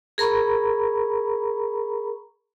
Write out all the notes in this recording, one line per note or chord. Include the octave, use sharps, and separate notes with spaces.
G#4 A#4 A#5 B5 C#6